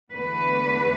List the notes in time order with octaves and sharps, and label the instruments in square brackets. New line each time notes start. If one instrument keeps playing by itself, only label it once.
[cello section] E2 D3 A3 B4